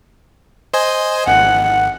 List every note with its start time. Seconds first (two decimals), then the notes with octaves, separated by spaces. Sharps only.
0.74 C5 D#5 G#5
1.28 G#1 F#5